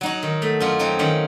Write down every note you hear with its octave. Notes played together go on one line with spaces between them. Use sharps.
F#3 D#4 F#4
D#3
A3
F#2 C#4 F4
F#3 C4 D#4
D#3 C#4 F4